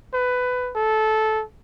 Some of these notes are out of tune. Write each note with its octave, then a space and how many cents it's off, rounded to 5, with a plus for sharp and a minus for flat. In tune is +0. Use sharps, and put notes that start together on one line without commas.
B4 +15
A4 -15